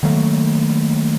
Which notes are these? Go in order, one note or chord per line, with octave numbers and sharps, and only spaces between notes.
D#3 F#3 A3 A#3